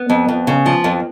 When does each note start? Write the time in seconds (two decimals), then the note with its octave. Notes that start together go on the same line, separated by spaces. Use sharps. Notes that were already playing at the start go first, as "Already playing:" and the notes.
Already playing: B3
0.10 F2
0.28 F2
0.47 C#3
0.66 F3
0.84 F2